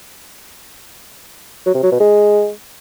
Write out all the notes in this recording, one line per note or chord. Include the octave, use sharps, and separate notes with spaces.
F#3
C3
F#3
B2
G#3